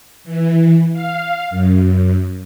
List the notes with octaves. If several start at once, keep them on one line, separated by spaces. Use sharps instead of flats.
E3
F5
F#2